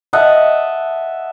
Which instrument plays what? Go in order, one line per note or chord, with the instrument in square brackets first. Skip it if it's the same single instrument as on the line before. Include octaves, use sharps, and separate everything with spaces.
[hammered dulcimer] D#5 E5 F#5 A5